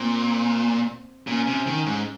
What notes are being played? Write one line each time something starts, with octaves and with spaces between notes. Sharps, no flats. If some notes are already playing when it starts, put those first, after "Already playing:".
Already playing: A#2 C4
A#2 C#4
C3
D#3
G#2